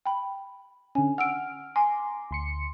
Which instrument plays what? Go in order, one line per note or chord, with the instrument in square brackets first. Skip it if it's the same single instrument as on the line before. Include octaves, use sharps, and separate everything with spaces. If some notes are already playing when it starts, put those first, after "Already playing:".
[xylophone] G5 B5
[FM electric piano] D3 C#4 [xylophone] G#5
[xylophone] F#5 E6 D7 [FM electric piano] F6
[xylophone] G#5 [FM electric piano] A#5 C6 D6
[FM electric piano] D2 C6 C#7